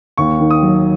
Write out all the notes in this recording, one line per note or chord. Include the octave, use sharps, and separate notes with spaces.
D#2 C#6
D#3
D#6
F#3